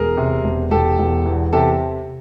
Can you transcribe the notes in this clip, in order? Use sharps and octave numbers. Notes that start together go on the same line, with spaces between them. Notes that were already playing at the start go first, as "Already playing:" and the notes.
Already playing: E1 G#4 A#4
C3
E1
E1 G4 A4
E1
E2
C3 G4 A4